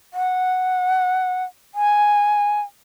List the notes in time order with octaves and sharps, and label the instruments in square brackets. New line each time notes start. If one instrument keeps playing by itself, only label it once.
[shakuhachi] F#5
G#5